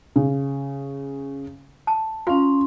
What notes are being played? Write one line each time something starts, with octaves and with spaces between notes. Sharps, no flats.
C#3
A5
C#4 F4 F5 C6